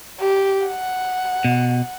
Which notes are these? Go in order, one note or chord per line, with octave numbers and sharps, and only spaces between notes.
G4
F#5
B2